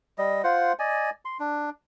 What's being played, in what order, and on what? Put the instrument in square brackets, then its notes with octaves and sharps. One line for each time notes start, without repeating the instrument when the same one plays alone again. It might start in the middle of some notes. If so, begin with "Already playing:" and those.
[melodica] G3 D#5
F4 C5 F#5
D5 D#5 G#5
C6
D4